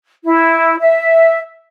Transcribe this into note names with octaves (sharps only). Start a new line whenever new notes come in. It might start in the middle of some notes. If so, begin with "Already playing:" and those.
E4
E5